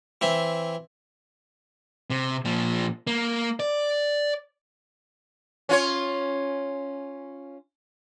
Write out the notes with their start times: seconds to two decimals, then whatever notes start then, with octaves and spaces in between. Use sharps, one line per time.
0.21 E3 C4 E5
2.10 C3
2.45 A#2 F3
3.07 A#3
3.60 D5
5.69 C#4 F4 C#5